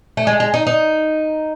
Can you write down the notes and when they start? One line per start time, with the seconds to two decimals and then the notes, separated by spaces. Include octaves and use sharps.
0.17 A3
0.27 G#3
0.40 G#3
0.54 D#4
0.67 D#4